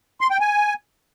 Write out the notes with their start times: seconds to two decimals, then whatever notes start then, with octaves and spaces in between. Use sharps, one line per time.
0.21 C6
0.31 G5
0.40 G#5